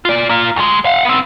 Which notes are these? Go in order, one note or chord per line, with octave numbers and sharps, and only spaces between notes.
F4 D5
A#3 F4
D2 G#3
F5 F#5
B3 C4